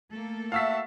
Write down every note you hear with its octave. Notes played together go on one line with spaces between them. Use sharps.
A3 A#3 A4
F#4 E5 F5 A5 E6 B6